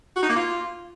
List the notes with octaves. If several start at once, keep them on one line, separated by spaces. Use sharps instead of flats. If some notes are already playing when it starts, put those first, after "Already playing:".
F#4
D#4
A#3
F4